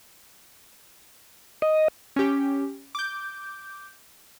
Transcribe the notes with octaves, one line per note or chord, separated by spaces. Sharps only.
D#5
C#4 G4
D6 G6